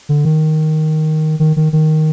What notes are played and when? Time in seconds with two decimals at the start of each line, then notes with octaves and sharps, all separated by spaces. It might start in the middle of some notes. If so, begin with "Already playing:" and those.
0.09 D3
0.25 D#3
1.40 D#3
1.57 D#3
1.73 D#3